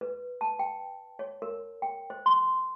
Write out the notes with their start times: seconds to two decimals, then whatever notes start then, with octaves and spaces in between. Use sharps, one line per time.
0.01 B4
0.41 A5
0.59 G5
1.19 C#5
1.42 A#4
1.82 G5
2.10 C5
2.26 C6